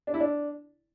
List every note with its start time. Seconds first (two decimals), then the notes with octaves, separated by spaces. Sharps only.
0.07 D4
0.14 E4
0.20 D4